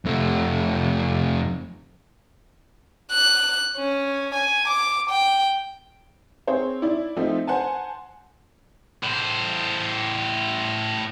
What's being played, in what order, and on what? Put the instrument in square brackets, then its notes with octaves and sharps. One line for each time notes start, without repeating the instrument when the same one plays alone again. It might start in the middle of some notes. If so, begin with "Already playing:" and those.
[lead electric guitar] F2 A3
[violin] F#6
C#4
G#5
D6
G5
[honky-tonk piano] C4 G#4 C5 C#5
E4 D5
F3 A3 C4 D#4
C5 F#5 G#5 A5
[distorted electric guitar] A2 C5